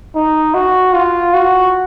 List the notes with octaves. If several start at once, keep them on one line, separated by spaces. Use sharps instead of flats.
D#4
F#4
F4
F#4